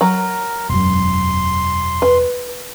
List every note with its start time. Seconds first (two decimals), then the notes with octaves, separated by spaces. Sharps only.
0.01 F#3 A#4
0.69 E1 F#2 C6
2.02 B4